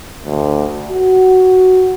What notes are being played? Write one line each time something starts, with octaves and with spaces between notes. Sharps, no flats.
D2
F#4